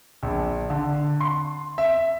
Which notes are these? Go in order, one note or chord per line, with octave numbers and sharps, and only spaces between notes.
A#1
D3
C6
E5